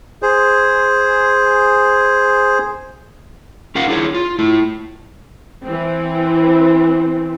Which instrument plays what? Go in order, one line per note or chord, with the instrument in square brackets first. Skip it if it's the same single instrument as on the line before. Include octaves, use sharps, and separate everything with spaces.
[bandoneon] G#4 C5
[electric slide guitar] C#4 F4 A#4 F5 F#5
D4 E4 G#4 C#5
F4
A3 E4
[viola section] E3 C4